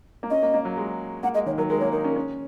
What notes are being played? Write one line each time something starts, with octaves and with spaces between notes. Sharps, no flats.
A#3
C#4 D#5
A#3
A#3
F#3
G#3
A#3 F#5
G#3 D#5
D#3 C#5
F#3 A#4
G#3 A#4
A#3 C#5
D#4 A#4
C#4
C#4